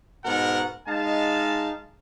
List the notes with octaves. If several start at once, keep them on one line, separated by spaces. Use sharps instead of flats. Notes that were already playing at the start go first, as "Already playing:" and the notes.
G#2 B2 A#4 F#5
G#3 D#4 F5 A5